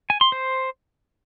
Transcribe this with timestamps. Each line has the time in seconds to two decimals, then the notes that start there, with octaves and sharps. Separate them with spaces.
0.10 G#5
0.21 C6
0.32 C5